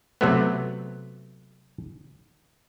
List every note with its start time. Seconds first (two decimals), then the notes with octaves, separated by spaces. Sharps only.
0.21 C3 F#3 A3 B3